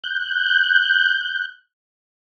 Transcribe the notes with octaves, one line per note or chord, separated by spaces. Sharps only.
F#6 G6